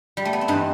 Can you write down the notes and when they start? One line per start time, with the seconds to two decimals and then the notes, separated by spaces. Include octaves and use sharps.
0.17 G3
0.25 A3
0.33 B3
0.41 C4
0.48 G2 E3 D#4